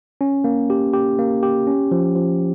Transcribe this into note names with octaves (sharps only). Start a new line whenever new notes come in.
C#4
A#3
G4
G4
A#3
G4
C#4
F3
F3